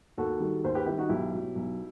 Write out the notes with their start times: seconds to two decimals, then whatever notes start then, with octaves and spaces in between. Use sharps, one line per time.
0.18 D#2 F#4 A4
0.40 D#3 G3
0.64 D#2 C5
0.74 G4 B4
0.86 D#3 G3 E4 G4
0.98 D#4 F#4
1.09 B1 E4 G4
1.32 B2 F#3
1.55 B1